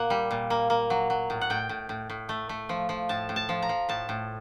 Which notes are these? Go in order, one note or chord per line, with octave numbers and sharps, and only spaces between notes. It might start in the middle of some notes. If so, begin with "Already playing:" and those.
Already playing: A#2 A#3 F#5
G3
A#2
A#3
A#3
F#3
F#3
A2
F#5
A2 G5
A2
A2
A2
A3
A3
F3
F3
A2 A5
A2
A5
F3
A#5
F3
A2 A5
A2